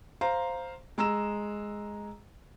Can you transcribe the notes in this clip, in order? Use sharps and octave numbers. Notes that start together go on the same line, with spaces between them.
C5 F5 A#5
G#3 A#5 E6 E7